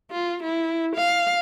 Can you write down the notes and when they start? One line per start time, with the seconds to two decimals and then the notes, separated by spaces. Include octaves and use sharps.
0.11 F4
0.43 E4
0.96 F5